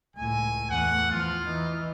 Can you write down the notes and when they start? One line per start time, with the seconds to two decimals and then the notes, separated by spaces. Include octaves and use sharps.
0.16 C#2 A2 G#5
0.70 E2 A3 F#5
1.11 E2 F3 F4
1.47 E3 D#4